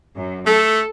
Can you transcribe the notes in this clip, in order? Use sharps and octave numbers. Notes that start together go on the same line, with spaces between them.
F#2
A3 A4